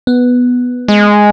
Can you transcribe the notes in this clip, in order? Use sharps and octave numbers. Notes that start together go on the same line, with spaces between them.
B3
G#3